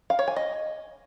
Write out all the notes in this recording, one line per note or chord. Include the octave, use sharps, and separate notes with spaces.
F5
C#5
G#5
D#5